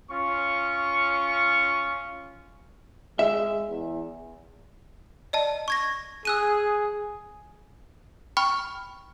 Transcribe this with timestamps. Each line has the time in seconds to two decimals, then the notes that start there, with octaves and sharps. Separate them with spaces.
0.11 C#4 F4 C#6
3.19 G#3 E5
3.69 E2
5.33 D5 D#5 A5
5.68 C#6 G#6 A#6
6.25 G#4 E6 F#6 D#7
8.37 G5 B5 C#6 F6